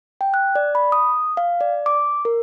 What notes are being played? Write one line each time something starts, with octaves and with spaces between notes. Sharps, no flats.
G5
F#6
D5
B5
D#6
F5
D5
D6
A#4